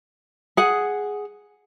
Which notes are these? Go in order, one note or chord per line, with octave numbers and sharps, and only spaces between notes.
G#4 F#5